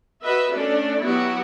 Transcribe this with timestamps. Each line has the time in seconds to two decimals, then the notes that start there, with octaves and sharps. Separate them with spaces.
0.24 F#4 B4 D#5 E5
0.53 A3 C#4 D4 D5
1.04 F#3 B3 E4 F#4 G4